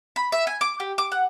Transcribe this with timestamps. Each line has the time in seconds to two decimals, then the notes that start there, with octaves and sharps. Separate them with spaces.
0.16 B5
0.32 E5
0.47 G#5
0.61 D6
0.80 G4
0.98 D6
1.12 F#5